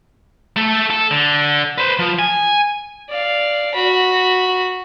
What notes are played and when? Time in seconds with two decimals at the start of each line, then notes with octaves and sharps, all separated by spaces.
0.56 A3 A4
0.90 A4
1.11 D3
1.78 B4 C5
1.99 F3
2.19 G#5
3.09 D5 F5
3.74 F#4 B5